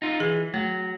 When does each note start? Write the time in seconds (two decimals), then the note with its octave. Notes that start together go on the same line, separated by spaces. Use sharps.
0.02 D#4 F4
0.20 E3 G#4
0.54 F#3 A3